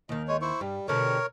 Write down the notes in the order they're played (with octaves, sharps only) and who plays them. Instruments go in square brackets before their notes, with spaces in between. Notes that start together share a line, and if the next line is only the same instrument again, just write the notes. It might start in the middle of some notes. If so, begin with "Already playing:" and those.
[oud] D#2 D#3 [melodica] D#5
[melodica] G#3 C#5
E4 C5 C#6
[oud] G2 [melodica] G3
[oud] B2 D3 G3 [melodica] A#4 C#5